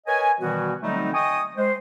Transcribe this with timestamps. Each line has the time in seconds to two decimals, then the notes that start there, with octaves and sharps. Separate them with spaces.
0.07 A#4 B4 C#5 D#5 G#5
0.40 B2 D#3 E3 G3 B3 F#4
0.82 D3 F#3 G3 A3 C4 D#4
1.14 D#5 G5 G#5 C#6 D#6
1.57 G#3 C5